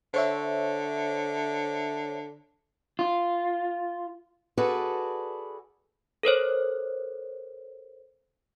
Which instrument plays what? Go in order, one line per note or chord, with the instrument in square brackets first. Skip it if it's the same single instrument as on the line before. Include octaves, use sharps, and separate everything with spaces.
[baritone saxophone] D3 [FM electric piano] C5 C#5 E5
[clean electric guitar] F4
[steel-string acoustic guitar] F#4 G#4 A4 B4 D5
[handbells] A4 A#4 C5 C#5